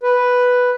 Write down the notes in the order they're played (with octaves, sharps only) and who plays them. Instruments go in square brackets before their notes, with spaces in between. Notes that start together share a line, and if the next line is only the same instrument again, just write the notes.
[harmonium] B4